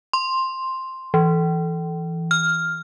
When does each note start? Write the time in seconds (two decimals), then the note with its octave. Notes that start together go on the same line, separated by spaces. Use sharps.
0.13 C6
1.14 E3
2.31 F6